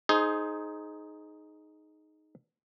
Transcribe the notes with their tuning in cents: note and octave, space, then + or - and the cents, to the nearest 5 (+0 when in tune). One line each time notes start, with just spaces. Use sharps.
D#4 +0 G#4 +20 C5 +0